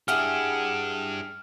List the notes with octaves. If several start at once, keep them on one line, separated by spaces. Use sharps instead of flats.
D4 E4 G4 G#4 F#5 F6